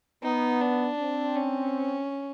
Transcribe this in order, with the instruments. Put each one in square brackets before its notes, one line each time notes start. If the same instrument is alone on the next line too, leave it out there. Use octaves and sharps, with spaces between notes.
[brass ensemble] B3 [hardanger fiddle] D#4
[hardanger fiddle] D4
[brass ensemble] C4
[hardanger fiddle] C#4